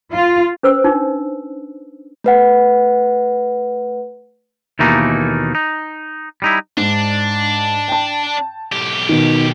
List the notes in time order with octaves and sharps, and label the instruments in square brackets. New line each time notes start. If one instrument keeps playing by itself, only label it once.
[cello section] F4
[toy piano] C#4 B4 C5 E6
D4 D#4
[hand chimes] A3 B4 F#5
[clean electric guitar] D#2 B2 E3 A3 A#3 D#4
D#4
G3 D#4 E4
[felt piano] G#2 [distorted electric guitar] D4
[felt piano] G5 A5
[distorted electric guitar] B1 G4
[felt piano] B2 D#3